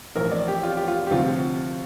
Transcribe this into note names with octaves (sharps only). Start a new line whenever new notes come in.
A1 A2 F3 A#4
D5
G4
F4
G4
F4
G4
D2 C3 F3 F4